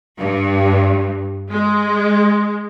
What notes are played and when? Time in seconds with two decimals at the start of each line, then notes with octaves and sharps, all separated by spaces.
0.18 G2
1.50 G#3